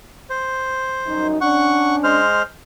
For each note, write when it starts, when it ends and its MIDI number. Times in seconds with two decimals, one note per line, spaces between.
0.30 1.27 72
1.06 1.36 42
1.06 1.36 55
1.06 1.36 63
1.41 2.20 61
1.41 2.20 62
1.41 1.96 78
1.41 1.96 85
2.04 2.42 56
2.04 2.42 72
2.04 2.42 89